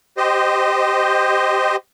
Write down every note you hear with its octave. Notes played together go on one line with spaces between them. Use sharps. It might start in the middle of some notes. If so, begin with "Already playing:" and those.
G4 C5 D#5